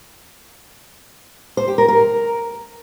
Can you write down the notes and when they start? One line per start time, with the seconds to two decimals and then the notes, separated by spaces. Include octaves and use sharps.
1.57 C5
1.68 G4
1.78 A#4
1.88 A#4